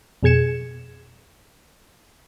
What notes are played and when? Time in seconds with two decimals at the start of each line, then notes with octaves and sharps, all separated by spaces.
0.23 F2 B2 G#4 G#6 C#7 E7